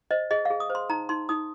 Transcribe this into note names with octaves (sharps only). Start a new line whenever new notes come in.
C5 D#5
G#4 D#5
F5
G#4
D#6
C5
C6
D#4 A#5
D#4 C6
D#4 D#6